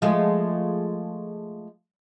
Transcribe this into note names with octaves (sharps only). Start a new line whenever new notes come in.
F3 G#3 A3